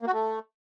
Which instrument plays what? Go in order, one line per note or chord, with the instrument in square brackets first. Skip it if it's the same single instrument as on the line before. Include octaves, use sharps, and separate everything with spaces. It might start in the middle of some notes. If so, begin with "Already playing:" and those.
[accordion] A#3
F#4
A3